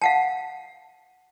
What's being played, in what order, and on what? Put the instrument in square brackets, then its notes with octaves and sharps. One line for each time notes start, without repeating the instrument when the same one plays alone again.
[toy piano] F5 F#5 A5